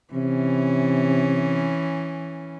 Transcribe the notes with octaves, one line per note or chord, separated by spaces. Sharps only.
C3 E3 C#4